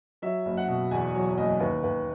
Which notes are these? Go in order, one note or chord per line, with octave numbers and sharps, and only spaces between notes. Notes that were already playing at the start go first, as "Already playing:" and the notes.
F#3 E5
F#1
F#5
B2
E2 G#5
F#3
F#1 D#5
D#2 B4
D#2 B4